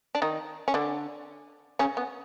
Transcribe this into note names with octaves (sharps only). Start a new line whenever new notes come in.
D4
D#3 D#4
C#4
D3 D4
C#3 C#4
B3